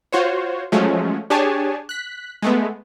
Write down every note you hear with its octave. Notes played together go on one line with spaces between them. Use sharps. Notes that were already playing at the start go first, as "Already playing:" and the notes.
F4 F#4 C5 C#5
F3 F#3 G#3 A3 C#4
D4 G4 G#4 C#5 G#5 A5
F#6 B6
G#3 A3 B3